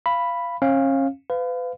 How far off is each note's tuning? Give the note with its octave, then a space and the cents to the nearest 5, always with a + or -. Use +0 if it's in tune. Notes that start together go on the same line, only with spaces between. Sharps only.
F5 -20 B5 +0
C#4 -35 F5 +0
B4 +35 F5 +0